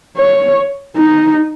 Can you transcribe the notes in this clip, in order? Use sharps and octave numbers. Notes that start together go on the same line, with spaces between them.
C#5
D#4